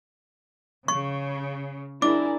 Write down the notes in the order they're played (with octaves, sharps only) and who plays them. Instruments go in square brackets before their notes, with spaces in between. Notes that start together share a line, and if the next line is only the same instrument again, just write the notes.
[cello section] C#3 [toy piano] C#6
[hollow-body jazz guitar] D4 [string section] E4 G#4 A#4 [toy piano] D6